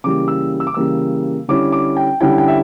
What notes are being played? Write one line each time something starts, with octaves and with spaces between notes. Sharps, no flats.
C#3 E3 G3 A#3 D6
E6
E6
D6
C#3 E3 G3 A#3 E6
D3 G3 C#4 E4 D6
D6
G5
D3 G3 C#4 E4 G5
G5
E5